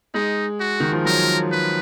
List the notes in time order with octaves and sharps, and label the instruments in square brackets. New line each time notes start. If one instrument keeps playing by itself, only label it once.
[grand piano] G#3 [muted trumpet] D#4
[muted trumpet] F#4
[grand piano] D#3
F3
[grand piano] F#3 [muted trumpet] A#4
[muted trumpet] B4